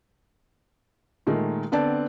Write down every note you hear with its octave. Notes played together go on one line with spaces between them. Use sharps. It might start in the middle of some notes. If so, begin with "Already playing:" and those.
A#2 D#3 G#3 A3
D3 B3 C4 D5 A5